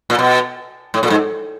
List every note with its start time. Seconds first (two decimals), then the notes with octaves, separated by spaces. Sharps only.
0.10 A#2
0.19 B2
0.94 A2
1.03 A#2
1.10 G#2